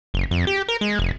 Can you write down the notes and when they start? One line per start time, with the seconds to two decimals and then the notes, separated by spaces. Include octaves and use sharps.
0.14 F#1
0.31 F2
0.47 G4
0.68 A#4
0.81 G#3
0.99 F1